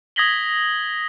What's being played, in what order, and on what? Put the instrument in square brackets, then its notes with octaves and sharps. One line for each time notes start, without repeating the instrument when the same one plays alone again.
[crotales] D#6 G#6 A#6 B6 F#7 G7